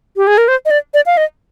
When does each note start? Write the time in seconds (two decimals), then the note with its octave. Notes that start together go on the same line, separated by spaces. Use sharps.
0.17 G4
0.27 G#4
0.38 A#4
0.48 C5
0.65 D#5
0.71 D5
0.94 D5
1.06 F5
1.17 D#5